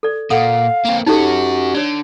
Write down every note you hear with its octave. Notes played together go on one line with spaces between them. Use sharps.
A4 D5
A#2 A4 F5 F#5 D#6
A#3 C4
C#4 D#4 F#4 G4 A4
D3 C#5 D5